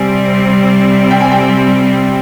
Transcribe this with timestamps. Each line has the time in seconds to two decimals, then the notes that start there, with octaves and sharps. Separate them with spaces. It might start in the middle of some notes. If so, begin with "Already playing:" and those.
Already playing: C3 G3 C4 G#5
1.11 G5
1.21 G#5
1.32 G5